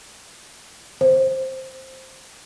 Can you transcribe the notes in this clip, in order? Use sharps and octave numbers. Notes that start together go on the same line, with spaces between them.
C5